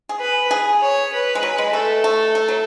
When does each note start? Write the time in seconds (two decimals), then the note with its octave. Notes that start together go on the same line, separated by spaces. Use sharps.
0.09 G#4
0.20 B4
0.51 G#4
0.81 C#5
1.13 B4
1.35 G#3
1.43 F#3
1.58 G#3
1.73 A3 A4
2.04 A3
2.35 A3
2.48 F#3